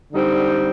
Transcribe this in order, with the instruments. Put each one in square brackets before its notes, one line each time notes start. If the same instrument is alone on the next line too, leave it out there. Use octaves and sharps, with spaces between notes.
[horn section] D3 G3 C4 D#4